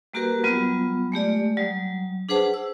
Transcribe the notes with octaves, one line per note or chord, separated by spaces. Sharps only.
G3 A#3 F#4 G4 A#4 B4
F#3 G3 B3 F4
G#3 A3 G4 D5
F#3 G3
D4 G#4 B4 C5 F#5 A5
E6